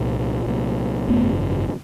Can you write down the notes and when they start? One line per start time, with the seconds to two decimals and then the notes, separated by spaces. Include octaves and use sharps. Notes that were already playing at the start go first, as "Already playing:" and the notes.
Already playing: C2 A#2
0.46 C2 A#2
1.08 G#1 F#2 C#3 A3 B3